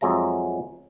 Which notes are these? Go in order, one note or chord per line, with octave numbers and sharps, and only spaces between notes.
F2 F#3 G#3 E5 A#5